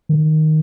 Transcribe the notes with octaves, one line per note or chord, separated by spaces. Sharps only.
D#3